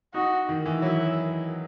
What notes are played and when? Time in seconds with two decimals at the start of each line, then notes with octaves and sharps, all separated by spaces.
0.14 D#4 F#4
0.49 D#3
0.66 E3
0.82 F#3 E4